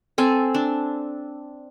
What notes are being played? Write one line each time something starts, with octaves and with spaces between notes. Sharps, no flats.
C4 A4 G#5
D4